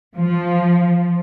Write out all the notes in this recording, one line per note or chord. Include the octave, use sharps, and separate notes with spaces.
F3